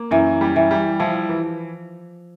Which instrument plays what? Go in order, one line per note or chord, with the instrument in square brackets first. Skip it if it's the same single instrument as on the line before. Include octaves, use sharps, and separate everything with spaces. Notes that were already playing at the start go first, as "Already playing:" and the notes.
Already playing: [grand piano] A#3
[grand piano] F#2 [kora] E3
[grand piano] G3
[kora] E3
[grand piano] G3
[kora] F3 [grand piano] E4
[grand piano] E3